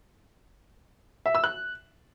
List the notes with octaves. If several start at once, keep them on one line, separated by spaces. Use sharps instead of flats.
E5
E6
F#6